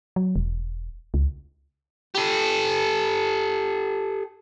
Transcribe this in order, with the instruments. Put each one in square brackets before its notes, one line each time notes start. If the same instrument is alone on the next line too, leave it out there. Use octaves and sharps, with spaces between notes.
[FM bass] F#3
E1
C#2
[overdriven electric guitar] G4 A4